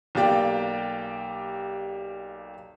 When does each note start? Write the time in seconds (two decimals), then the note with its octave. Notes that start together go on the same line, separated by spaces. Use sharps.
0.15 B1 A#3 G4 D5 G5